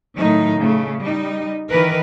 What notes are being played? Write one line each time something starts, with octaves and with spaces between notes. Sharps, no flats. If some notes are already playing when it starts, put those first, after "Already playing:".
A2 D#3 F#3 D#4
C#3 A3
G3 D#4
D#3 E3 A#4 B4